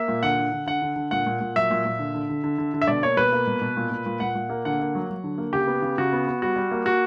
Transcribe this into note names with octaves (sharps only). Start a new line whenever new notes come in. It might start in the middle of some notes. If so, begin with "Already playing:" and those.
Already playing: A#3 E5
A#2
D3 F#5
D3
D3
D3 F#5
D3
D3
A#2 F#5
A#2
A#2
F#3 E5
A#2
A#2
D3
D3
D3
D3
D3
D3
E5
B2 D5
A#3 C#5
B2 B4
A#3
B2
B2
A#2
A#2
A#2
A#2 F#5
A#2
A#3
D3 F#5
A#3
F#3
F#3
D3
A#3
C#3 G4
B3
C#3
C#3 F#4
B3
B3
G3 F#4
G3
A#3
A#3 F#4